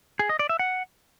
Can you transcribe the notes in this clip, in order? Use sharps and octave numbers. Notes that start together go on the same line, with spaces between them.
G#4
D#5
D5
E5
F#5